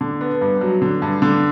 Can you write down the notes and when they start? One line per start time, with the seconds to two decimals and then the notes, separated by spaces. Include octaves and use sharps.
0.01 D3
0.21 B3
0.41 G2
0.61 F#3
0.82 D3
1.02 G2
1.22 D3